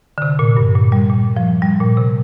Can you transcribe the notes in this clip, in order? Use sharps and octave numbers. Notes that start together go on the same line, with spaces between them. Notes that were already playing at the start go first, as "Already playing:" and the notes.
D3
C3
A#2
G2
A#2
G3
A#2
F3
G3
A#2
C3